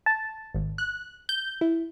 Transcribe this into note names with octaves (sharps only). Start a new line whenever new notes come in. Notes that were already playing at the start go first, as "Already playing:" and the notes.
A5
G#1
F#6
G6
E4